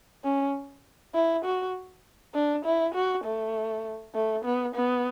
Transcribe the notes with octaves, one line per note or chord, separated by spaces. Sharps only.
C#4
E4
F#4
D4
E4
F#4
A3
A3
B3
B3